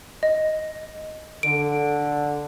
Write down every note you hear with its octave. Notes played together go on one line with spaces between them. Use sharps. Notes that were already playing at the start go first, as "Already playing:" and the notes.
D#5
D3 D7